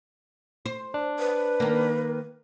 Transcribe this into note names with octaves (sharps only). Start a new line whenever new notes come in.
C5
D4
B4
D#3 A#3